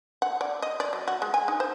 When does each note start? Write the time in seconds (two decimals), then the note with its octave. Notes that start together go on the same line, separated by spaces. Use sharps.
0.22 F#5
0.41 D5
0.62 D#5
0.80 D5
0.93 F#3
1.08 F#4
1.22 G#3
1.34 G#5
1.48 D#4
1.60 C5